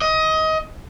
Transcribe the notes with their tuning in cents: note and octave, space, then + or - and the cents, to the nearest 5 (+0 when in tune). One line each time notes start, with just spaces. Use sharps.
D#5 +20